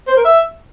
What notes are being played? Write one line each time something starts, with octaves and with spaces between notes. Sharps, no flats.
C5
A#4
E5